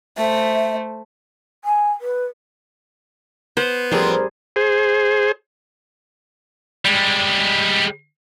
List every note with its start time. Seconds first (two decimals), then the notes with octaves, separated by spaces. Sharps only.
0.17 A3 C5 E5
1.64 G#5
2.01 B4
3.57 B3 C5
3.91 A1 F3 G3 C4 G#4 A#4 C5
4.56 G#4 C5
6.85 G3 G#3